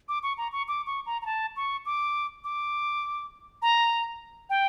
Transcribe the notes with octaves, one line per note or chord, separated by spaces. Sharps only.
D6
C#6
A#5
C#6
D6
C#6
A#5
A#5
A5
C#6
D6
D6
A#5
G5